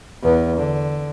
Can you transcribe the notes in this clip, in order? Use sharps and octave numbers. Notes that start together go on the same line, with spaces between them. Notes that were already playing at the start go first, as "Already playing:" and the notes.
E2 B3
D3